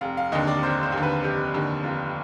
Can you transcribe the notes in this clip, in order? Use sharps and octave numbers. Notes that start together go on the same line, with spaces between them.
F1 F5
F5
D#2 D3 D#5
D5
F1 C5
C5
D#2
D3
B4
F1 G4
D#2 D3
F1 F4